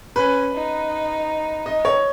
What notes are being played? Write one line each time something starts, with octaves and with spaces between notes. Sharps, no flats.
C#4 B4
D#4
D#5
C#5